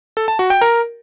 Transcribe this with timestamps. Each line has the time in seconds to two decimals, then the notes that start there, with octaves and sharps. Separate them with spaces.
0.17 A4
0.28 A5
0.39 F#4
0.50 G5
0.61 A#4